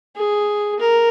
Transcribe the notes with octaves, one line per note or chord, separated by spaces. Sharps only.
G#4
A#4